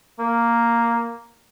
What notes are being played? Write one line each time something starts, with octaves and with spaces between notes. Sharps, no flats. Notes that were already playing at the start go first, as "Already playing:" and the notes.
A#3